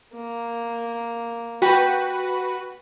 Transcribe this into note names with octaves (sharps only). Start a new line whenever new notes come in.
A#3
F#4 G4 B4